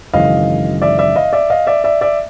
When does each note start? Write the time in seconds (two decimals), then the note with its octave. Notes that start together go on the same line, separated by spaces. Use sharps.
0.14 G#1 F#2 C#3 E3 D#5 F5
0.82 D5 E5
0.99 D5 E5
1.16 D#5 F5
1.33 D5 E5
1.50 D#5 F5
1.67 D5 E5
1.84 D5 E5
2.01 D5 E5